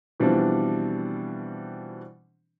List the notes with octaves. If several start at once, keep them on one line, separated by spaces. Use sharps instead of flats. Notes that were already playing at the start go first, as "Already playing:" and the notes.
B2 E3 F3 G3 C4 D4